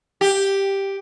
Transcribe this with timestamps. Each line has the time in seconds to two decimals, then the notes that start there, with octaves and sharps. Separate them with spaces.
0.21 G4